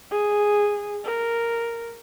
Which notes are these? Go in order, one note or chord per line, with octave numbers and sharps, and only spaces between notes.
G#4
A#4